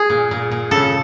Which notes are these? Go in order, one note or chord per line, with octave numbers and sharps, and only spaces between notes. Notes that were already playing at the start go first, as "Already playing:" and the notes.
Already playing: G#4
A#2
A#2
A#2
C#3 A4